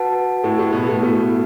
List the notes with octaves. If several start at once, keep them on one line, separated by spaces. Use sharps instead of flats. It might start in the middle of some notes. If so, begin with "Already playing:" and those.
Already playing: F#4 B4 F#5 A5
A2 A3
A2 A3
B2 B3
A2 A3
A2 A3 B3 F#4 A4